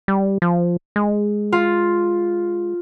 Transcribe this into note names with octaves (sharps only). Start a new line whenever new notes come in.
G3
F3
G#3
F4